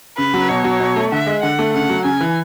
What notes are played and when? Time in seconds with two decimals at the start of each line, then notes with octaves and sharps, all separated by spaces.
0.18 C#3 B4
0.34 F#3
0.49 B2 C#5
0.64 F#3
0.80 B2
0.96 A3
1.11 D3 E5
1.27 G#3
1.43 D3 F#5
1.59 A3
1.74 C#3 F#5
1.89 F#3
2.04 C#3 G#5
2.21 E3